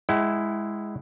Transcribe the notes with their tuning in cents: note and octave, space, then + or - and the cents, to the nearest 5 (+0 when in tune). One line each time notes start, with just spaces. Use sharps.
G#3 +0 E4 +0 F#5 +45